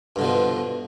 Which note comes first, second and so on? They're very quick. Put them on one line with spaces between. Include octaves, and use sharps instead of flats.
G2 D3 B2 F3